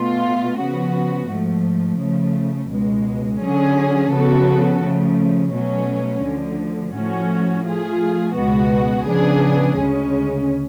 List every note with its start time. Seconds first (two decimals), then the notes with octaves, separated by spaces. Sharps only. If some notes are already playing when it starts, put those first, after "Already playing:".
Already playing: B2 A3 F4
0.58 C#3 F3 B3 F#4
1.29 G#2 F3 A3
1.99 C#3 F3 A3
2.70 C#2 B2 G#3
3.41 D3 F#3 C#4 G#4
4.12 C#3 F3 B3 F#4 A4
4.82 C#3 F3 A3
5.52 B2 F#3 A3 C#4
6.23 D2 D3 F3
6.93 A2 F3 A3 C#4 F#4
7.64 F3 A3 F4 G#4
8.35 C#2 B2 G#3 B3 F#4
9.06 C#3 F3 B3 D4 G#4
9.76 D2 C#3 G#3 C#4